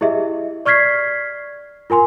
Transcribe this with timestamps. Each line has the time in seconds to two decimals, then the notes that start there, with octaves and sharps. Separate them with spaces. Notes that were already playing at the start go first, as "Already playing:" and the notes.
0.01 E4 G4 G#4 D#5 E5
0.66 D5 C#6 F6 G#6 B6 C7
1.90 F4 A#4 G#5 C6